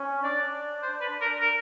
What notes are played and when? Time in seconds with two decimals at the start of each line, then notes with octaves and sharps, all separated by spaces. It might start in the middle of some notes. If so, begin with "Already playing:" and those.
Already playing: C#4
0.24 D4 D5
0.83 C5
1.01 B4
1.21 A#4
1.40 A#4